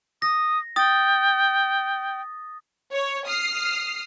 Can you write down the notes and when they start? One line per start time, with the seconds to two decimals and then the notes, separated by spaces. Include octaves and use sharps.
0.22 D#6 A#6
0.76 G5 D#6 A6
2.92 C#5
3.27 D#6 F6 C7